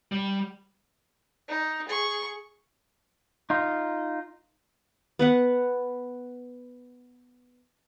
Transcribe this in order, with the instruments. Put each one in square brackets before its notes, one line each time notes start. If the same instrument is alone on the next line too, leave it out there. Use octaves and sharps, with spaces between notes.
[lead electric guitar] G3
[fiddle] D#4
G#4 C#6
[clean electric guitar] D#4 F4
[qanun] B3 B4 F#5